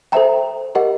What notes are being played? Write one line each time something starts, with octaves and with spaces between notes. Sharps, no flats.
A4 C5 E5 G5 A#5
G4 A#4 D#5 F#5